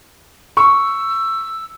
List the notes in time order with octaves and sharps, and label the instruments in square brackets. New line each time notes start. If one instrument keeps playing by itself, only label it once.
[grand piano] C#6 [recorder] E6